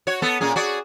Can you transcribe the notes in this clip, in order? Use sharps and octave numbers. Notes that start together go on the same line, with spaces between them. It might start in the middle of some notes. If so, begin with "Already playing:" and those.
F#4 C#5
B3 A4
A#2 C#4 G#4
F#4 G#4 D5